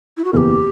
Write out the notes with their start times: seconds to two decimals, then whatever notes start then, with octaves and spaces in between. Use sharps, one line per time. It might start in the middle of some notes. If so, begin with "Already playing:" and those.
0.17 E4
0.24 F#4
0.33 F#1 E2 B2 A#3 G4 A#4